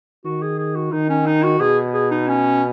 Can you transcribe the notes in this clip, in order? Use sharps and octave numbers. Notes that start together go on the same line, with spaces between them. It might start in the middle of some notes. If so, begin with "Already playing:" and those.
D#3 F#4
G#4
G#4
F#4
D#3 D#4
C#4
D#4
F#4
B2 G#4
G#4
D#4
C#4